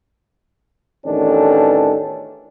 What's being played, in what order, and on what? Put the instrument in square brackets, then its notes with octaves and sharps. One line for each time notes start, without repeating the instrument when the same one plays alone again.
[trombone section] A1 E2 D#3 C#4 D4 A4